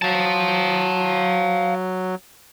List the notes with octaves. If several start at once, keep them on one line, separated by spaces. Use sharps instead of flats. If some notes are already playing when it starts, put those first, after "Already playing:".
F#3 F5 A5